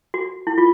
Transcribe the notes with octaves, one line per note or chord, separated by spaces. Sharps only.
F#4
E4
F4